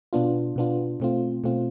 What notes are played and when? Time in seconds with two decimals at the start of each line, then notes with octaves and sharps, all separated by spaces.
0.13 B2 B3 D4 F4
0.56 B2 B3 D4 F4
1.00 B2 A3 C4 F4
1.44 B2 A3 C4 F4